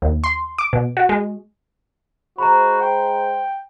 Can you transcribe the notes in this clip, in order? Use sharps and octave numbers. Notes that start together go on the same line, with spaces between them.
D#2
C6
D6
B2
F#4
G#3
G#3 F#4 C5 A#5 B5
G5